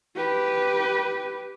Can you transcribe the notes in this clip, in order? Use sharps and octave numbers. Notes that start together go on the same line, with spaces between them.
G4 B4